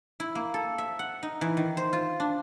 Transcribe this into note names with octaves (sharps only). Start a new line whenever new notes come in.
E4
A#3
A4
E5
F#5
D#4
E3
D#3
C5
F4
D4